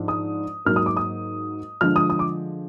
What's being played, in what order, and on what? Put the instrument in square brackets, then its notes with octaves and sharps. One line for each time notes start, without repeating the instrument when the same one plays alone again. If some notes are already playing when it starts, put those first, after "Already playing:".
Already playing: [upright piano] G#2 F3 D4
D#6
G#2 F#3 A#3 F6
D#6
D6
D#6
D3 F3 G#3 F6
D#6
D#6
D6